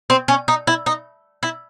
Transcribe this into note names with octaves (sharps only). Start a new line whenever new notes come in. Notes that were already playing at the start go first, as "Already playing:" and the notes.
C4
C#4
D#4
E4
D#4
E4